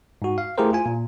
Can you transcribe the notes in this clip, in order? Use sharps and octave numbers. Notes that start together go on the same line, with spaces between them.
G#2 F#4
F5
A3 E4 G4 G#4 A#4 C5
F4 G#5
A#2